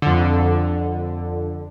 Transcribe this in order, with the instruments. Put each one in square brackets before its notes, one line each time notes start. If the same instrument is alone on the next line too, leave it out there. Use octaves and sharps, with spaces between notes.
[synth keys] F2 D3